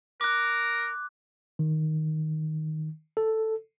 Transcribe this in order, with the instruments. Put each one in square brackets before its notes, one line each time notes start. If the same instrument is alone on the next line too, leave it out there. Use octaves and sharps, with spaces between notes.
[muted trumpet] A#4 [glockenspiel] D6 F#6
[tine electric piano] D#3
A4